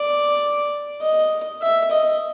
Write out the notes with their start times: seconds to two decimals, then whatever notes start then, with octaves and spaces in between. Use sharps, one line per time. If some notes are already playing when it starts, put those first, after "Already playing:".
Already playing: D5
1.02 D#5
1.62 E5
1.91 D#5